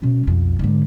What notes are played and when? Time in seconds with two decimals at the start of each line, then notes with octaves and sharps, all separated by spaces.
0.02 B2 C#4
0.27 B1 F2
0.59 G#2 D3